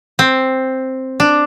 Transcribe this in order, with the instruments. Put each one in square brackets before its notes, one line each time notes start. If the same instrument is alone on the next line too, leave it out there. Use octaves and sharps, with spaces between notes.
[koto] C4
D4